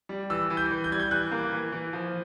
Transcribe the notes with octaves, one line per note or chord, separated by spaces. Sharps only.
G3
E3 E6
E3
G6
E3
G6
G3 G#6
G6
E3 F#6
A#3
E3
E3
F3